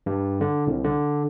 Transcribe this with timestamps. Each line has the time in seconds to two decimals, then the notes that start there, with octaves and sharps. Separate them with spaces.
0.06 G2
0.41 D3
0.67 C2
0.84 D3